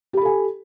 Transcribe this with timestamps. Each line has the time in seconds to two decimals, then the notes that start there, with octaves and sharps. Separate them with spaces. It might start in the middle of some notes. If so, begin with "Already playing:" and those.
0.13 G4
0.17 B5
0.21 A4
0.25 G#5